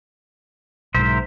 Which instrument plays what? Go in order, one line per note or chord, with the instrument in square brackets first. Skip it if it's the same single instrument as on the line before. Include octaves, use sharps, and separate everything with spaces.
[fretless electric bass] B1 G#2 [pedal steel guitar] A#4 C5 E5